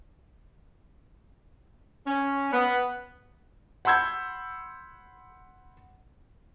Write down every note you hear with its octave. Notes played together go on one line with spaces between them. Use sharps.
C#4
B3
F#5 B5 C6 E6 G6 G#6